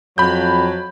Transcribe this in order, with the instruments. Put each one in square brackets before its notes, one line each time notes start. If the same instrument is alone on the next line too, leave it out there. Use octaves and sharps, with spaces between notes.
[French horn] F2 [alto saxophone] F#3 [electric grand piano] B5 G6